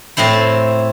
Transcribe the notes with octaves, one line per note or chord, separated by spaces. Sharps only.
A2 C4 E4 C5